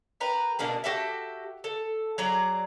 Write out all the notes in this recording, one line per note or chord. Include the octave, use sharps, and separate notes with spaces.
G4 A#4 B4
B2 A#3 D4 G#4
F#4 G4 A4 E5
A4
F#3 G#4 D5 A#5